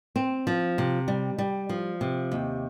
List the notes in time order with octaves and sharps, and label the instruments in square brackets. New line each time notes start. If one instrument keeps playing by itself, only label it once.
[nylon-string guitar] C4
F3
C3
G3
G3
F3
C3
D#2